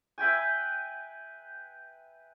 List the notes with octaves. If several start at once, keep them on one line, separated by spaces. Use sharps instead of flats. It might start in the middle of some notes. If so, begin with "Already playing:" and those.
B4 E5 G5 G#5